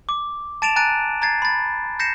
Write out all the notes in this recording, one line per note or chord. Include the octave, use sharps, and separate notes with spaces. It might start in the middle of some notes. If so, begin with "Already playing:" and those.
D6
A5 A6 D7 E7 F7
G#5 A#5 F#6 A6 D7 D#7
A#5 G#6 A6 C7
B5 A6
G6 A#6 C7 C#7 E7